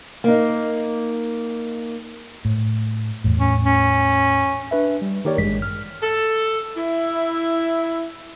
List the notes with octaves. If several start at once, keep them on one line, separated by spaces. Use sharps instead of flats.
A#3 D#4
A2
E2 A2
C#4
C#4
D4 B4 E5
G3
D#3 A#3 G4 A#4 C#5 D5
A1 G2 G#3 B6
F6
A4
E4